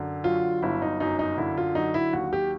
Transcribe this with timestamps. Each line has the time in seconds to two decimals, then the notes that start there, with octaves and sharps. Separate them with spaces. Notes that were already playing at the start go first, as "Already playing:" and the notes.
Already playing: F#2 D3
0.24 F#3 F4
0.62 G1 E4
0.82 D#4
1.00 F#2 D#4
1.19 D#4
1.37 D3 E4
1.57 F4
1.75 F#3 D#4
1.94 E4
2.13 D#2 F#4
2.33 G4